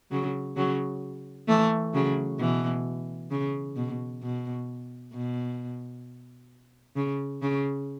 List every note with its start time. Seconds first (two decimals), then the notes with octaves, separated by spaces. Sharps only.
0.11 C#3 F#3
0.57 C#3 F#3
1.48 E3 A3
1.94 C#3 F#3
2.40 B2 E3
3.31 C#3
3.76 B2
4.23 B2
5.13 B2
6.96 C#3
7.42 C#3